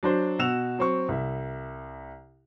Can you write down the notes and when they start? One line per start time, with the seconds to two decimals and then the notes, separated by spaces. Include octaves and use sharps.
0.03 F#3 D4 C5
0.39 B2 F#4 E6 E7 F7
0.78 F#3 C4 C#6
1.08 C2 E5